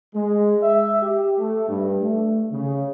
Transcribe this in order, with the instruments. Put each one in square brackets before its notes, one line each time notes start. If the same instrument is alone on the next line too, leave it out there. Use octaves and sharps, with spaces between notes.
[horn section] G#3
E5
G4
A3
G2
A3
C#3